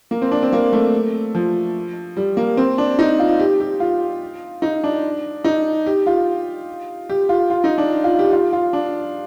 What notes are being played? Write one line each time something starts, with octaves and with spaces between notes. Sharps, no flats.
A#3
C4
D4
C4
A#3
A3
F3
G3
A#3
C4
D4
D#4
F4
G4
G4
F4
D#4
D4
D#4
G4
F4
G4
F4
F4
D#4
D4
F4
G4
F4
F4
D4